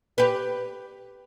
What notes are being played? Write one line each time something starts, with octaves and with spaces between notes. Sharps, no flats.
G4 B4